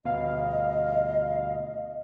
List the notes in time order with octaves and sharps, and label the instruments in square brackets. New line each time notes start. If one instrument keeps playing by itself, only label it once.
[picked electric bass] D2 B2 [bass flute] D#5 [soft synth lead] F5